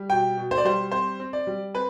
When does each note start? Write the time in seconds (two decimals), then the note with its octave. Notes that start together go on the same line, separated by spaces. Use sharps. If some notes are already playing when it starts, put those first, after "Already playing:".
Already playing: G3
0.10 B2 G5
0.37 B2
0.51 C5
0.58 D5
0.65 G3 C5
0.92 C4 C5
1.20 C4
1.33 D5
1.47 G3
1.74 C4 B4